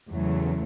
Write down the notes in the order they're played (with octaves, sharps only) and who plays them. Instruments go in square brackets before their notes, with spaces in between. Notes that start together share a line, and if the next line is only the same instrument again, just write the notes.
[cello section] E2 C#3 F#3 A3